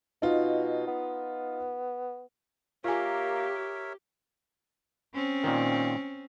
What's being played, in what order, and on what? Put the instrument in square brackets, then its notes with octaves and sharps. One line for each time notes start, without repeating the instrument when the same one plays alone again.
[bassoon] B2 [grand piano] D#4 F4
[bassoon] B3
[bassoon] A#3 [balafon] F4 G#5 [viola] G4 [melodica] A#4 C#5 E5
[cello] C4 C#4
[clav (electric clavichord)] A#2 D#3